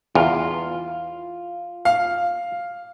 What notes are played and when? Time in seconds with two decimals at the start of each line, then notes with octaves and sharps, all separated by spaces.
0.15 E2 F4
1.85 F5